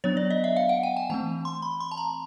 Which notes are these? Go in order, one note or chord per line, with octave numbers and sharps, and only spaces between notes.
F#3 B3 D4 C#5
D5
D#5
E5
F5
F#5
G5
G#5
E3 A3 C4 A5
C6
B5
C6
A5
A#5